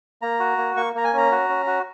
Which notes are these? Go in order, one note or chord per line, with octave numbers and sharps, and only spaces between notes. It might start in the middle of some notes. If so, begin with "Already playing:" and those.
A#3 A#5
F#4
A#3
A#3 C#6
A#3 A#5
G#5
C#4 A#5
F#4
C#4
F#4